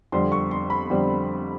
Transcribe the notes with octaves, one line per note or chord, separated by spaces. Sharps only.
F2 D3 G3 C4 C6
C#6
C6
B5
F2 D3 G3 C4